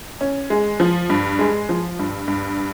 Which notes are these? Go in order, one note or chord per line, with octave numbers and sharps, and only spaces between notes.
C#4
G#3
F3
G2
G#3
F3
G2
G2